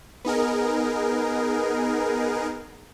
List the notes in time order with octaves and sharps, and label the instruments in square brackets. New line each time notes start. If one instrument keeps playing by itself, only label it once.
[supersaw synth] B3 D#4 G#4 A#4